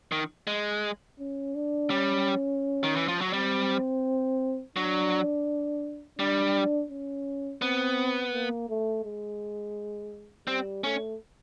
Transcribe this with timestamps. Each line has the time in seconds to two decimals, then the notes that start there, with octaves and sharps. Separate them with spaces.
0.12 D#3
0.47 G#3
1.19 C#4
1.55 D4
1.90 G3 C#4
2.84 D#3
2.96 E3
3.08 F3
3.21 F#3
3.33 G3 C4
4.76 F#3 D4
6.19 G3 D4
6.90 C#4
7.62 B3 C4
8.33 A#3
8.69 A3
9.05 G#3
10.47 G3 C4
10.84 A3 C#4